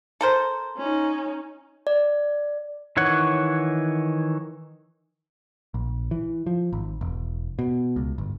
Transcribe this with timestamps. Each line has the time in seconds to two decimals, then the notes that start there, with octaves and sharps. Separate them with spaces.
0.21 A4 A#4 C5
0.77 C#4 D#4
1.87 D5
2.97 D#3 E3 C#5 F#5
5.74 A#1
6.11 E3
6.47 F3
6.73 G#1
7.01 E1
7.59 B2
7.96 C#2
8.18 G1